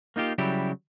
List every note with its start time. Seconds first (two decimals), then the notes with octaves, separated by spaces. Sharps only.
0.16 A#3 D#4 F4 G4
0.38 C#3 F#3 G3 E4 G4